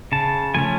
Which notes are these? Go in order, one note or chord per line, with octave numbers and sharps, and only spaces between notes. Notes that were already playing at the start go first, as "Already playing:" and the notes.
C#3 A5
F3 A3 C#4 G#5